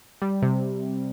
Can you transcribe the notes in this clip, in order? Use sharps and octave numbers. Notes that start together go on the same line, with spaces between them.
G3
C3